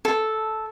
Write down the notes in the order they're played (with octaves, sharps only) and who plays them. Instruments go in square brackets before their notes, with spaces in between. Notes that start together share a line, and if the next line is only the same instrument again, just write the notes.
[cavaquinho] A4